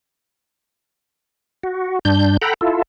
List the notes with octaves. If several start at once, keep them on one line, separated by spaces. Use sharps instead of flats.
F#4
G2 D4 G6
A4 F#5 G5 A#5 B5
E4 F4 A4